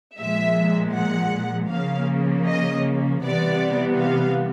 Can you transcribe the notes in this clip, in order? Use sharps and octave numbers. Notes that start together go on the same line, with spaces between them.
A#2 F3 G#3 E5
F#5
C#3 F3 A#3 F5
D#5
C3 E3 G3 B3 D5
F5